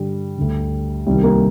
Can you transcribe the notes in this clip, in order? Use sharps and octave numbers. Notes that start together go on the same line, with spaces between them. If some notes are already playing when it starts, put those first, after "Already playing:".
Already playing: G2 D3 G3
D2 D3
C2 C3 D#3 G3
A#3